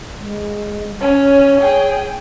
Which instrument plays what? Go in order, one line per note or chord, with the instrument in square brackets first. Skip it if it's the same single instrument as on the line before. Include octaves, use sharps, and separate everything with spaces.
[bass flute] G#3
[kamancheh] C#4 [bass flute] C#5
[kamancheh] G#4 G5